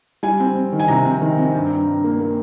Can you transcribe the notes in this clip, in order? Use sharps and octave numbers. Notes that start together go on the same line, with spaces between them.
G3 G#5
C4
C4
D#3
G#5
C3 A#5
C4
D#3
C4
G2
G2
G2
A#3
A#3